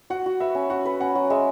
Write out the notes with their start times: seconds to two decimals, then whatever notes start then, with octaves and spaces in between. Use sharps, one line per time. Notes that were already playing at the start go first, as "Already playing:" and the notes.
0.10 F#4 F#5
0.26 F#4
0.40 B4 E5
0.55 C#4
0.70 F#4 F#5
0.85 B4
1.00 C#4 F#5
1.15 F#3
1.30 G#3 E5